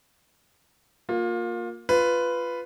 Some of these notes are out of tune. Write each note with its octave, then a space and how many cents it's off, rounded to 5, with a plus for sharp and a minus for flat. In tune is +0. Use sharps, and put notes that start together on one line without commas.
A#3 +0 F4 +25
F4 -5 B4 +5